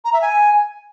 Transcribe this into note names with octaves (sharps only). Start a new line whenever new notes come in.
A#5
E5
G#5